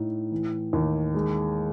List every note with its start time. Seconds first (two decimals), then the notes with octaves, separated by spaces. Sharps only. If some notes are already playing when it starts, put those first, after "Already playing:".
Already playing: A2 D#4
0.32 E3
0.73 D#2
1.14 G#3